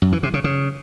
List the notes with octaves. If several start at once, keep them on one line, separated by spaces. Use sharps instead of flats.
F#2
E3
C3
C#3
C#3